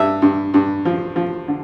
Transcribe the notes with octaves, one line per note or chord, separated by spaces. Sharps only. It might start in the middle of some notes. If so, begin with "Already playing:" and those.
Already playing: G2 E5
G2
G2
F3
F3
D3